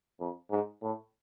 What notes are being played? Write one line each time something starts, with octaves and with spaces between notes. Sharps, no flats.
F2
G#2
A2